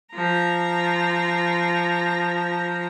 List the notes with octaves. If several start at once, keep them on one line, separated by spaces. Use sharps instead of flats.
F3 A#5